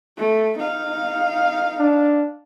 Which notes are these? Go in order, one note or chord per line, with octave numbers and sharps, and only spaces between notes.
A3
D#4 F5
D4